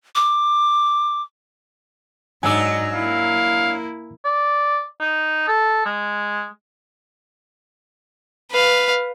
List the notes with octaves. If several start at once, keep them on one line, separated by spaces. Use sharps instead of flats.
D6
G#2 F#3 D4 D#4 D5 G#5 E6
A#3 E4 F5
D5
D#4
A4
G#3
B4 F5